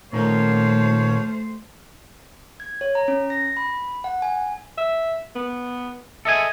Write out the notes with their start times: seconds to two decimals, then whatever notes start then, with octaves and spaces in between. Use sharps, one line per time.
0.13 A#2 D#3 F3 A3 A#4 C5 C#5
2.60 G#6
2.81 C#5
2.95 A#5
3.08 C#4
3.30 A#6
3.57 B5
4.04 F#5
4.22 G#5
4.77 E5
5.35 B3
6.25 A4 D#5 E5 G#5